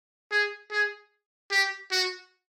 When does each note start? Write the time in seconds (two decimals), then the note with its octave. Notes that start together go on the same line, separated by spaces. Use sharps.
0.31 G#4
0.71 G#4
1.51 G4
1.91 F#4